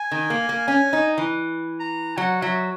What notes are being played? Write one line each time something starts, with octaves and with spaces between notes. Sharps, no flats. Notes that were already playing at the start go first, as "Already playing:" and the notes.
Already playing: G#5
D#3
A#3
A#3
C#4 G#5
D#4
E3
A#5
F#3 F#5
F#3 E5